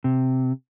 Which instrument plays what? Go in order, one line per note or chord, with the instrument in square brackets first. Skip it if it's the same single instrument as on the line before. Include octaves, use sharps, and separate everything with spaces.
[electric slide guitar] C3